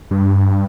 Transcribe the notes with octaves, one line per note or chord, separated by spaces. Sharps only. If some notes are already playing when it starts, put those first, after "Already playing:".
G2